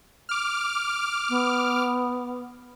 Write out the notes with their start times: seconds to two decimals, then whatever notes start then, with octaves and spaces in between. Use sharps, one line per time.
0.29 D6 F6
1.29 B3